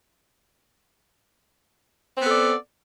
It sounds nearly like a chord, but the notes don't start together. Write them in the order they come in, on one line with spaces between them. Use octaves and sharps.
C4 B3 A4 D5